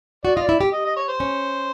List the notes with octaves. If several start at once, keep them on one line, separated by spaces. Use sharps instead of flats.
F#4 D5
F4 D#5
D5
E4
G4
D#5
D#5
C#5
C5
C#4